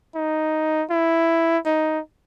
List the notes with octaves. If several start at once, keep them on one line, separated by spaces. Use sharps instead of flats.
D#4
E4
D#4